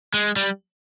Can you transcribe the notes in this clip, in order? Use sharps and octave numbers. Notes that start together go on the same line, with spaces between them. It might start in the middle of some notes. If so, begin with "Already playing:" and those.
G#3
G3